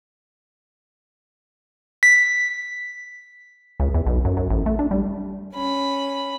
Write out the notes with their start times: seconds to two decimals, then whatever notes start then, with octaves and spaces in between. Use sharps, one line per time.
2.03 B6
3.80 C#2
3.94 E2
4.07 B1
4.25 F#2
4.37 F#2
4.50 A1
4.66 A3
4.79 D4
4.91 G3
5.54 C#4 B5